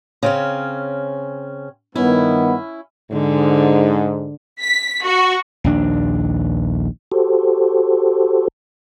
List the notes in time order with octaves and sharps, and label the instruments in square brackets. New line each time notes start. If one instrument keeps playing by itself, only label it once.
[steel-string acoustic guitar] C#3 C4 C#4
[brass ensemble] G2 D#3 B3 [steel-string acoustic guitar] C#4 E4
[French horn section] G#2 [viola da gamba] D3
[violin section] B6
F#4
[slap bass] A#1 D#2 D4
[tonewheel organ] F#4 G4 A4 C5